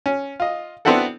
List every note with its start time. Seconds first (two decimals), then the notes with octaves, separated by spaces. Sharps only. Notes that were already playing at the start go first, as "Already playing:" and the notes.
0.06 C#4
0.40 F4 D#5
0.85 B3 C4 D4 E4 F#4 A4